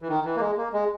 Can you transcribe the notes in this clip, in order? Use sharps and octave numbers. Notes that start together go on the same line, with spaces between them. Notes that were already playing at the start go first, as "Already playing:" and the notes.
E3
D#3
E3
A#3
G#3
A#3
G#3